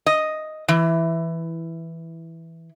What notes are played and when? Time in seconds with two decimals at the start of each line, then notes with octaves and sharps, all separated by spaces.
0.06 D#5
0.68 E3